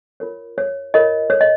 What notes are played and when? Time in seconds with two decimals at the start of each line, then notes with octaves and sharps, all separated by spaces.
0.20 F4 A#4 C#5
0.58 C#5
0.94 F4 A#4 C#5 D#5
1.30 C#5
1.41 D#5